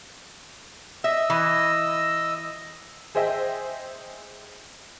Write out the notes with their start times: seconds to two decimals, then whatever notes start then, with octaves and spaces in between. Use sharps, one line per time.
1.04 D#5 E5 E6
1.30 E3
3.15 G#4 C5 D#5 E5 G5